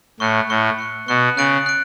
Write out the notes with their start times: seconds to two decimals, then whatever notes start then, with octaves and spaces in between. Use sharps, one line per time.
0.20 A2 C#6 F#6 C#7
0.49 A2 C#6 F#6 C#7
0.78 C#6 F#6 C#7
1.08 B2 C#6 F#6 C#7
1.37 C#3 F#6 A6 D7 F#7
1.66 F#6 A6 D7